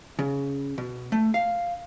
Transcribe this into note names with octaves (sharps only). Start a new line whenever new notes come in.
C#3
B2
A3
F5